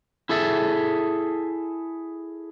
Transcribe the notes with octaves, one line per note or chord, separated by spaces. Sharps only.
E4 G#4 A4 E5